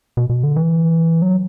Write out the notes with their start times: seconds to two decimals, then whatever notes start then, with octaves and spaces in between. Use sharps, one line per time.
0.17 B2
0.29 B2
0.43 D3
0.56 E3
1.22 F#3